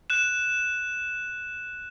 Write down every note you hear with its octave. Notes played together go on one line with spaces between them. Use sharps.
F#6 E7